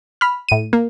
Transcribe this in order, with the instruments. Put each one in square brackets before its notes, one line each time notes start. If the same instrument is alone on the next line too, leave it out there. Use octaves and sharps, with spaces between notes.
[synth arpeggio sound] B5 F6
A2 D#7
A#3